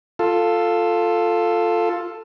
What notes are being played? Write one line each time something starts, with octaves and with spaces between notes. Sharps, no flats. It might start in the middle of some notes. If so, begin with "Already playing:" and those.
F4 A4